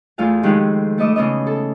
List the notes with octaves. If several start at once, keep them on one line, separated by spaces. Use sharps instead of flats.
E2 A3 F4 F5 G#5
F2 D#3 G#3 F4 G4 F#6
A3 A4 B4 D#5 D6 E6
C#3 E3 B3 C#4 D#5
A4